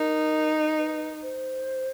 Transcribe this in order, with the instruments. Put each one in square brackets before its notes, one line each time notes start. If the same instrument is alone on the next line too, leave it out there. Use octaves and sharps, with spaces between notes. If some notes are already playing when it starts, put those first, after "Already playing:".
Already playing: [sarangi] D#4 [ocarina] A#4
[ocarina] B4
C5